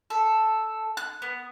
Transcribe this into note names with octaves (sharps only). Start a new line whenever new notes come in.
A4
F#6
B3